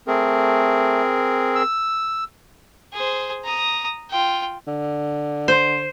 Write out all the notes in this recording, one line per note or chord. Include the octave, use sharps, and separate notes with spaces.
A3 C4 G#4 A#4
E6
G#4 C5
A#5 D#6
F4 G5
D3
C5